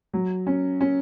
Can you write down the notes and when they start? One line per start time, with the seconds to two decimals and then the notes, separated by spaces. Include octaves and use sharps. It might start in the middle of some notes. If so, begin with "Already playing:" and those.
0.14 F#3
0.47 C#4
0.81 C#4